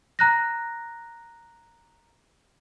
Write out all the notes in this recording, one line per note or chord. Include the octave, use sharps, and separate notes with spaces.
A#5 F#6 A#6